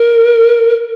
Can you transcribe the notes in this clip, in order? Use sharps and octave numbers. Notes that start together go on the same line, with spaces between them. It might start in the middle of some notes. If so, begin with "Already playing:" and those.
Already playing: A#4